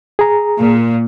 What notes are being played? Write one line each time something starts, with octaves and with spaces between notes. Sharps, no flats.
G#4 A#5
A#2